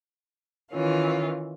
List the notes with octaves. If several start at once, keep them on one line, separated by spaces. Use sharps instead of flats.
D#3 E3 C#4 F4